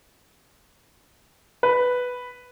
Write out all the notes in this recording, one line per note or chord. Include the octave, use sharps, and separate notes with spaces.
B4